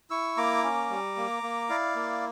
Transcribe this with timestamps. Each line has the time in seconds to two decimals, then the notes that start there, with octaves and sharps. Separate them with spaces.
0.10 E4 C#6 E6
0.37 A#3 A#5 D6
0.63 C#4
0.90 G3
1.17 A#3
1.43 A#3
1.69 E4 D5 F5
1.96 A#3